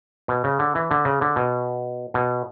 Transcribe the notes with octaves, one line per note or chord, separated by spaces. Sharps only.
B2
C#3
D3
E3
D3
C#3
D3
B2
B2